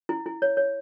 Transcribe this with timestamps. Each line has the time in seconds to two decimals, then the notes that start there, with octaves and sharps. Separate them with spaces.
0.09 E4
0.26 E4
0.42 C#5
0.57 C#5